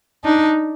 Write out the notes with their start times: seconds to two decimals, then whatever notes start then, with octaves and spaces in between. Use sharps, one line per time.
0.24 D4 D#4